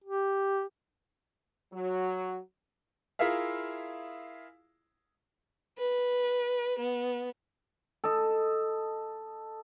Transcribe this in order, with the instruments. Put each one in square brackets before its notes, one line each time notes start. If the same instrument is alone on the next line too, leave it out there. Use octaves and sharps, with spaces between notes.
[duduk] G4
[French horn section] F#3
[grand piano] E4 F4 G#4 A#4 E5 F5
[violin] B4
B3
[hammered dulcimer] A4 D#5